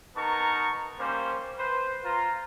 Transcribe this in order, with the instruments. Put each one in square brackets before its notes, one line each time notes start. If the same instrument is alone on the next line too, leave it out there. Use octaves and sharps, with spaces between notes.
[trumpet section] B3 D#4 A#4 A5 A#5 C#6
G3 A#3 C#4 C5
B4 C5
F4 A#5